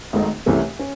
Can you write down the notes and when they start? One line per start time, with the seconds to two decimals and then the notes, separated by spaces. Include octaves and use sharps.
0.13 G#1 G#2 D#3 A3 D#4
0.46 C2 C3 E3 A3 C#4
0.79 C#4